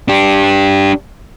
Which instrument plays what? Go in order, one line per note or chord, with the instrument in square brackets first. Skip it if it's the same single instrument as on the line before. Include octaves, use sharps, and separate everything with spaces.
[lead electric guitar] D4 G4